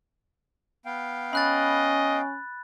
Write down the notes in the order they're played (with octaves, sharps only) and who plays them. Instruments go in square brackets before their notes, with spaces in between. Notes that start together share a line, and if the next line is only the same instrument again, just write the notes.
[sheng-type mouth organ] B3 F5 G5
[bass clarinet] C#4 [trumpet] D#5 [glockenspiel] B5 F#6 A6